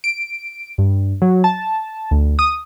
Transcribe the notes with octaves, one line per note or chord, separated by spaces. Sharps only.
D7
G2
F#3
A5
D2
D#6